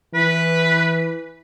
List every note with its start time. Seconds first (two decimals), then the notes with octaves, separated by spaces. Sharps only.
0.14 E3 B4